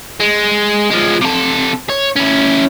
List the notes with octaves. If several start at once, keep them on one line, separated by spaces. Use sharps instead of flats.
G#3
F3 G#3
C3 A4
C#5
C#4 E4